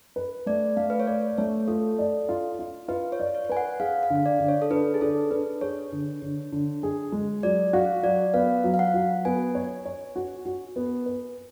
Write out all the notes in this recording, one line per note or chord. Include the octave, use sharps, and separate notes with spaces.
B4
A3 D5
A3 F5
B4
C#5
B4 D5
A3 C#5
F4 A4
D5
F4
F4
F4 B4
C#5
D5
C#5
B4 G#5
F#5
G#4 F5
F5
D3
F5
D5
D3
C#5
A4
D4 B4
G#4
D4 A4
D4 B4
G#4 C#5
D3
D3
D3
G#4
G#3
F#3 D5
F#4 F5
F#3 D5
B3 F5
F#3
F5
F#5
F#3
B3 G#5
C#5
C#5
F#4
F#4
B3
B4